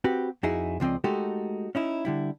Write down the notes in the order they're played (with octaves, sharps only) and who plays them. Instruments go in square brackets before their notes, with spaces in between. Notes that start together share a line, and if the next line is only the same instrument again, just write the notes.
[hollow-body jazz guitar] C4 F#4 G4 B4
F2 D#4 E4 F#4 G#4
C#2 F3 C4 D5 D#5
G#3 A3 D#4 F#4 G4 A4
C#4 D#4 E4
D3 G3 E4